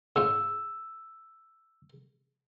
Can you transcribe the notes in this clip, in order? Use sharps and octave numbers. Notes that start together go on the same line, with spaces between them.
G#2 C#4 F4 E6